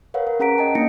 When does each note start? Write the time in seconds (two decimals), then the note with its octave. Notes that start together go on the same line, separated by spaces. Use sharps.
0.14 A#4 B4 C#5 F5 F#5
0.27 A#4
0.39 C#4 G#4 F#5 A#5 B6 D7
0.58 G#4 D#5 G5 A5
0.75 A#3 D4 D#4 D#5 A#6 C#7